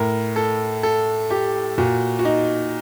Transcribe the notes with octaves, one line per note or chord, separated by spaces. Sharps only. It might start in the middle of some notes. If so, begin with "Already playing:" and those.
Already playing: A2 A#4
A4
A4
G4
A#2 F#4
F#4
D#4